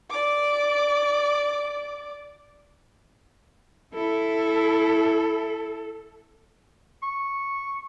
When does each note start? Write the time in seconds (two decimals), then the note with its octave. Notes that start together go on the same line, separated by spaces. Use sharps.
0.10 D5 D6
3.94 E4 A4
7.03 C#6